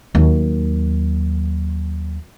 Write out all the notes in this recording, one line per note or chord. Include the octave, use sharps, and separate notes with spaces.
D#2 F#3